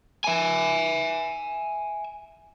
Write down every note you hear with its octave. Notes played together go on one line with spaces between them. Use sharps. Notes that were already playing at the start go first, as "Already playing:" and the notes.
E5 G#5